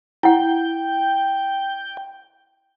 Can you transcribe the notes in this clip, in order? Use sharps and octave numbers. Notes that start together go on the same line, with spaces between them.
E4 F#5 G5